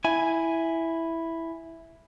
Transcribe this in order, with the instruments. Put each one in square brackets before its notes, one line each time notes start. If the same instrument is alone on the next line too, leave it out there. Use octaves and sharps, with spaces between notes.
[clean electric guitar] E4 G#5